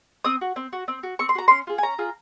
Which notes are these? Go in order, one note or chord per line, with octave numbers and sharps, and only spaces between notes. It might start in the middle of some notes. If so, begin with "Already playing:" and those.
C4 D#6
F#4
C4
F#4
C4
F#4
C4 C#6
C6
F#4 A#5
C#4 C6
F4 G#4
G#5
C#4 A#5
F4 G#4